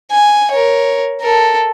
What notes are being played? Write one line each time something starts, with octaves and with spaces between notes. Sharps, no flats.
G#5
A#4 C#5
A4 A#4